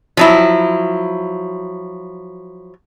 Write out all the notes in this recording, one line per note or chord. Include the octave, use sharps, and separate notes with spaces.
F3 F#3 E4